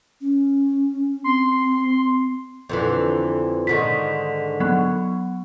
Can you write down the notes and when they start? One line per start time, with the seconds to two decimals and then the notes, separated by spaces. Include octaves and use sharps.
0.21 C#4
1.24 C4 C6
2.69 F2 D3 E3
3.67 G#2 D3 D#3 B6
4.60 F#3 B3